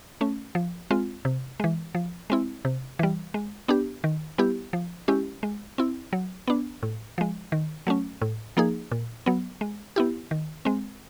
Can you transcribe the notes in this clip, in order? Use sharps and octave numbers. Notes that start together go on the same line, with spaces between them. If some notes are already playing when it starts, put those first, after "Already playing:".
A3 C#4
F3
G#3 C4 F4
C3
E3 G#3
F3
G#3 C4 E4
C3
E3 G3
G#3
B3 D4 G4
D#3
G3 B3 E4 G4
F3
G#3 C#4 E4 G4
G#3
C4 E4
F#3
B3 D4
A2
F3 G#3
D#3
F#3 A3 C#4
A2
F3 A#3 D#4 G#4
A#2
F#3 B3
G#3
B3 E4 G4
D#3
G#3 C4